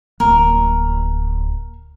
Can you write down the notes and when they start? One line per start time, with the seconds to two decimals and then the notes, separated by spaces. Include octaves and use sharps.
0.20 D1 A#3 A#4